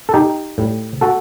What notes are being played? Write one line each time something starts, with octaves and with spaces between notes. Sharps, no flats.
A4
D#4 G4
A2 G3
F#4 A4